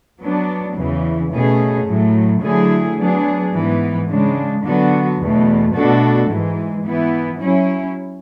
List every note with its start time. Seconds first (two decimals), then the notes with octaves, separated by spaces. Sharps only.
0.21 F#3 B3 D4
0.76 E2 C#3 E3
1.32 B2 A3 C#4 G#4
1.87 A2 F#3 A3
2.42 D3 F#3 A3 E4 G#4
2.97 F#3 B3 D4 G#4
3.53 G#2 E3 B3
4.09 C#3 G#3 D4
4.63 D3 F#3 B3 F#4
5.20 E2 B2 A3
5.74 B2 A3 D4 F#4 A4
6.30 G#2 E3 G#3
6.86 E3 B3 E4
7.40 F#3 C#4 E4